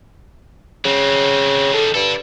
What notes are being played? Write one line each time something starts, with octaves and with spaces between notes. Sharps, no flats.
C#3 F#3 C4
D#3 G3 A4
G2 A4 D5